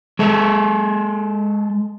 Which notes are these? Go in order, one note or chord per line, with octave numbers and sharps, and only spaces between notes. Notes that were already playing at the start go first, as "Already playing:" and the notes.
G#3 A4